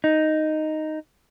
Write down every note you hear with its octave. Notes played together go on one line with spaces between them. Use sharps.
D#4